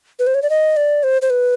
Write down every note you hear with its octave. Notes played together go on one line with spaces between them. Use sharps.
B4
C5
C#5
D5
D#5
D5
C5
C5
B4